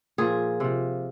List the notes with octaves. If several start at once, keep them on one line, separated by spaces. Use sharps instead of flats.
A#2 F3 G#4
C3 F3